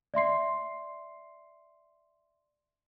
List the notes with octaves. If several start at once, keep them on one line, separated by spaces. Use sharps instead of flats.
D5 E5 C6 C7